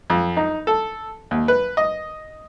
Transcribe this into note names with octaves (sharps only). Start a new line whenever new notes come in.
F2
D#4
A4
D#2
B4
D#5